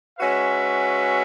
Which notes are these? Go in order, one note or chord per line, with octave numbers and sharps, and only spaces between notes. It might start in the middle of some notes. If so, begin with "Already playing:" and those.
G#3 C#4 F#4 B4 E5